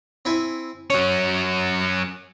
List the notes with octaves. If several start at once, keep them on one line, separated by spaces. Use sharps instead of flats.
C4 E4 G#5
F#3 C#4 C#5